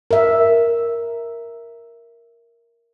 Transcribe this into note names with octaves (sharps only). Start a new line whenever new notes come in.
A#4 E5